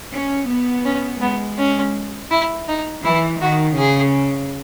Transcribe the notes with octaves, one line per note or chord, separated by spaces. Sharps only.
C#4
B3
C#4
G#3 B3
C#4
E4
D#4
E3 E4
D#3 F#4
C#3 G#4